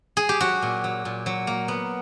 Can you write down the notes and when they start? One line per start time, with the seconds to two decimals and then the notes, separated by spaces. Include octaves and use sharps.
0.17 G#4
0.29 G4
0.40 F#3 F#4
0.62 A#2
0.84 F#3
1.05 A#2
1.26 F#3
1.47 A#3
1.68 B3